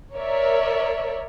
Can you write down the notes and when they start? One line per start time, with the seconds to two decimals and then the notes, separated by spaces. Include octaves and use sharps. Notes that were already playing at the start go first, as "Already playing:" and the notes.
0.14 A#4 C#5 D5 E5